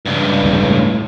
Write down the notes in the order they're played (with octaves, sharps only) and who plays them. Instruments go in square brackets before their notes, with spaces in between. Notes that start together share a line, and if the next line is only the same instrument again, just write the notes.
[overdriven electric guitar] C#2 G2
[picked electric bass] D1 E2
A2